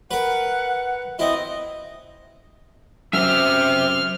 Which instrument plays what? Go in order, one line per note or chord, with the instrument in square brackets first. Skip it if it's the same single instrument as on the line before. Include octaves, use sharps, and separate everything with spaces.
[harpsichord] A#4 B4 [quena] F#5
[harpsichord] C4 E4 [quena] D#5
[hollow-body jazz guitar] F#2 [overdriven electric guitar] C4 E5 [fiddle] F6